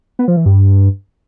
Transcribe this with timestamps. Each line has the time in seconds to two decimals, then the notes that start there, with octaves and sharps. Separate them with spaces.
0.19 B3
0.28 F3
0.37 E3
0.46 G2